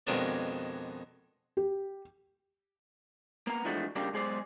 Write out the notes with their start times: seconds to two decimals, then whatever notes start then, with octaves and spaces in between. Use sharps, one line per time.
0.07 F2 B2 D#3 G#3 D4 D5
1.57 G4
3.47 A#3 B3 A#5
3.65 E3 F3 G#3 A3 D4 F#4
3.96 C#3 G3 A#3 D4 G4
4.13 B1 G#3 G#4 C5 D5